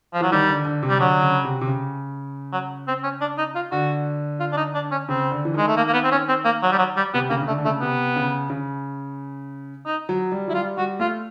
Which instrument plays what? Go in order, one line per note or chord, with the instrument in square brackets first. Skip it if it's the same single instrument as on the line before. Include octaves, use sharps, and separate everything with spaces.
[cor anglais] F3
[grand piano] E3 [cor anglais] F#3
[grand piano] D#3 [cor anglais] G3
[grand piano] D3
D3
C3
[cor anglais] G3
[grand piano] D3 [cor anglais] F#3
[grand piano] C#3
C3
C3
C#3
[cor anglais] F#3
C4
C#4
D4
D#4
F4
[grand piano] D3 [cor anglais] F#4
[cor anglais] F4
D4
D#4
D4
C#4
[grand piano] C#3 [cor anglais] C4
[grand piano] D3
E3
[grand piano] D#3 [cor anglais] G#3
[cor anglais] A3
A#3
A#3
B3
C4
C#4
C4
A#3
F#3
G3
F#3
G3
[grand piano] C3 [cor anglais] B3
[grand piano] C#3 [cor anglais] A#3
[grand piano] C#3
[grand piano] D3 [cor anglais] A3
[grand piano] D3
[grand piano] C#3 [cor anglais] A3
[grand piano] C3 [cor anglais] B3
[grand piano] C#3
C#3
[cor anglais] D#4
[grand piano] F#3
G3
[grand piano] F#3 [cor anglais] E4
[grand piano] G3 [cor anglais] F4
[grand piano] G3 [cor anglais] F#4
[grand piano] A3 [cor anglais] F4